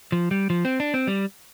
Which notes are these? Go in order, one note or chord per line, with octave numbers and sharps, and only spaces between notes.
F3
G3
F3
C4
D4
C4
G3